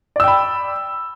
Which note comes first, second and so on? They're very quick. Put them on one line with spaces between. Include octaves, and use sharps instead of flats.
D5 E6 G5 B5